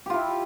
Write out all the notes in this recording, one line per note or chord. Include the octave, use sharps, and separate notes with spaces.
E4 F4 G4